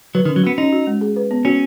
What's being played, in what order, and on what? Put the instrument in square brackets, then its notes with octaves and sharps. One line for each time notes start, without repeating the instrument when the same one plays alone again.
[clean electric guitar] F#3 [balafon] B4
[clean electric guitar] D#3
[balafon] C#4
[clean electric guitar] F#3
[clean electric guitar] B3 [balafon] F#4
[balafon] C#4 [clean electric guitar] D#4
[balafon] F#4
G#3
G#4
B4
B3
[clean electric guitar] C#4 [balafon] F#4